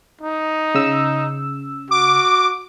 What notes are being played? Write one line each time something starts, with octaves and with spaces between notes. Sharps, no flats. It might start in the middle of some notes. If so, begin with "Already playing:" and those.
D#4
C#3 E6
F#4 D6